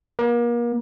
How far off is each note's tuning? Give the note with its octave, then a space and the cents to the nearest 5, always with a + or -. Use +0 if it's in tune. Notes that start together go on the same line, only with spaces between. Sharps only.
A#3 +35